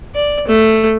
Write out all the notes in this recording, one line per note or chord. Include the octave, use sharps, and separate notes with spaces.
D5
A3